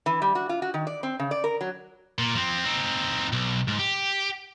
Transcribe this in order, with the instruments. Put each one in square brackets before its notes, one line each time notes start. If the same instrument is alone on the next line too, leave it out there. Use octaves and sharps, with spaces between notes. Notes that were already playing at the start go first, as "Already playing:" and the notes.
[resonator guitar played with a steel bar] E3
G3
F#4
F4
F#4
D#3
D5
C4
C#3
D5
A#4
F#3
[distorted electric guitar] A#2
F3 C4
C4 D#4
B1
G#2
G4